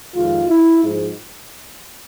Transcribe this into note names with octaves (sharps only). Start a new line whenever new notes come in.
F2 C3 D#3 G#3 F4
E4
G#2 F3 G#3